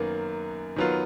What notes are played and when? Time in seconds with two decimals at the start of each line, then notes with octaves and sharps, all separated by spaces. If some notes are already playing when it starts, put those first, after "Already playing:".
Already playing: F#2 D#3 A#3 B3
0.76 D#3 F#3 B3 F4